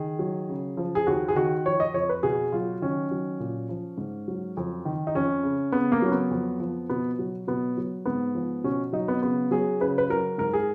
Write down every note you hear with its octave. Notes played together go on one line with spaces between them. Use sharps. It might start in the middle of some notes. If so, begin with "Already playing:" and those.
Already playing: D#3 G#4
F#3
C#3
F3
G#4
D#2 F#4
G#4
D#3 F#4
F3 C#5
D#5
F2 C#5
B4
B2 G#4
F#3 F4
D#3 C#4
F#3
A#2
F3
G#2
F#3
F2
D#3
D#4
F2 C#4
C#3
C#3 B3
A#3
F#3 C#4
B3
F2
F3
B2 B3
F#3
B2 B3
F#3
G#2 B3
F3
B2 C#4
F#3 D#4
B3
C#3 B3
F#3 G#4
C#3 B4
B4
F#3 A#4
G#2 A#4
G#4